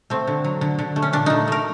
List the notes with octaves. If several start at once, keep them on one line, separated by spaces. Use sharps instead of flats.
A3 C4
D3
F#3
D3
D3
A3
C#4
A#2 D4
A3 D#4
A3 A#4